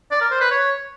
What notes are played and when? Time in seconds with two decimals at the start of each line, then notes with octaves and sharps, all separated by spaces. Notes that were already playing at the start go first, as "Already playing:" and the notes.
0.11 D5
0.21 A#4
0.31 C5
0.41 B4
0.51 C#5